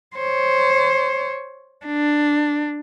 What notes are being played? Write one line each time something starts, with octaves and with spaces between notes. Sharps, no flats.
C5 C#5
D4